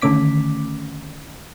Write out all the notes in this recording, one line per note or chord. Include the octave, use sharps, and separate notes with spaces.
D3 D#3 A3 C#4 D6 B6